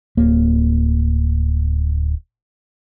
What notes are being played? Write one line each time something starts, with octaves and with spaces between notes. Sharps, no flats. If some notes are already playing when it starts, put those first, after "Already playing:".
D1 A#3